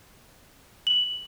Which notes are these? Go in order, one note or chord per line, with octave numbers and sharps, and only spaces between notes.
F#7